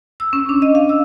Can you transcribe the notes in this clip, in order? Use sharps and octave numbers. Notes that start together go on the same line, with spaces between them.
E6
C#4
D4
D#5
F5
E6